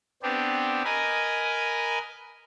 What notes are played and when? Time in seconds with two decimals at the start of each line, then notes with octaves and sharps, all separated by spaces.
0.23 B3 C4 D4 G4
0.84 A#4 B4 D#5 G#5